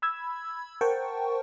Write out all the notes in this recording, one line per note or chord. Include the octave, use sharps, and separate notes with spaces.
B5 E6 G#6
A#4 C5 F#5 G5 A5 C#6